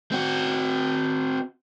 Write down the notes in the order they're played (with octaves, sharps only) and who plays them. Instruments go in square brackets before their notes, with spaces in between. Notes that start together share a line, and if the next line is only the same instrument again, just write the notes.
[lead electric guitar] C4 F#4